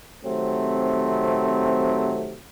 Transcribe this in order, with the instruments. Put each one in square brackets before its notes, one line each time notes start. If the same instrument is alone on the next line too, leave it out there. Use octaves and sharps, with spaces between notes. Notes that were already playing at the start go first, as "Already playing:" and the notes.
[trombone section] C3 D#3 F#3 A3 C4